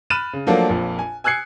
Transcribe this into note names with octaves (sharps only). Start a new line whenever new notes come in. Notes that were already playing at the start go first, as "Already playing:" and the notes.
B5 F6 F#6 A6 D#7 E7
C#3
F3 F#3 A3 A#3 D4 F4
A#1 F2 A#2
G#5
G#5 E6 F#6 G#6 C7 C#7